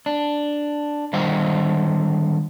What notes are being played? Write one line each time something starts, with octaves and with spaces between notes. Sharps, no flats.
D4
D3 D#3 G3 C5 D#5 F5